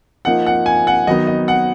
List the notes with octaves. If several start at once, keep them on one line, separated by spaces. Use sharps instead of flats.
F3 A#3 D#4 F#5
F#5
G#5
F#5
D#3 F#3 B3 D#4 D#5
D#5
F#5